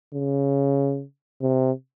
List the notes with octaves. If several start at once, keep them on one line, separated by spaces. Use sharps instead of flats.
C#3
C3